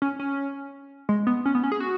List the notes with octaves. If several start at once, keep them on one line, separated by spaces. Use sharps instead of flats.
C#4
C#4
G#3
B3
C#4
B3
C#4
G#4
F#4